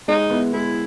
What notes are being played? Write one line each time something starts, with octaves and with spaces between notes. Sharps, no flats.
G#3 D#4
B3 E4
G#3 E4